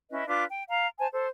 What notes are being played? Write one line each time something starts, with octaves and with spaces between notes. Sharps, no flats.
C#4 E4 B4 D#5
D4 F4 B4 D6
G5
F5 A#5
C5 G#5 A5
A4 C5